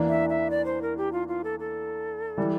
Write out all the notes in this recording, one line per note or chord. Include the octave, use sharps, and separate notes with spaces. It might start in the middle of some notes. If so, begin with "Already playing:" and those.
Already playing: E2 E3 A#3 D4
E5
E5
D5
C5
A#4
G4
F4
F4
A4
A4
E3 G3